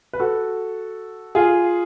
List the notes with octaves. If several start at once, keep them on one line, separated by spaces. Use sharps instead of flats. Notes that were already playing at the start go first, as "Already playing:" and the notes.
B4
F#4 A4
F4 G#4